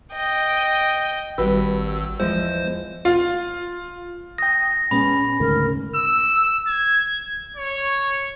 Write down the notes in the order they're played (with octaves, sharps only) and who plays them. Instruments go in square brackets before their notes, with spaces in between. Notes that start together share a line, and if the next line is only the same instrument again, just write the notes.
[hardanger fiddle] D#5 G5
[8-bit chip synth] G#1 E6 [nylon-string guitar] G3 F#4 B4
[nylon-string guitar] E2 F3 G#3 [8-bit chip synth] C5
[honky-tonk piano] F4
[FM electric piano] G5 D#6 [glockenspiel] A#6
[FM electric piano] A#2 G#3 B3 [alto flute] C#4 [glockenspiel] B5
[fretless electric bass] D2 G#2 C#3 [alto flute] A#4
[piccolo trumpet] E6
G#6
C#5